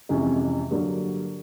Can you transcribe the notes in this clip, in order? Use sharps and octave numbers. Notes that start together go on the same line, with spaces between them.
F2 C3 E3 G#3 C#4
G2 D3 F#3 A#3